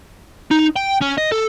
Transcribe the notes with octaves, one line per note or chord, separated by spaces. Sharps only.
D#4
G5
C#4
D#5
A4